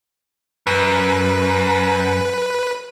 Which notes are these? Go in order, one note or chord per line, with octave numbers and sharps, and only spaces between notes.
F#2 B4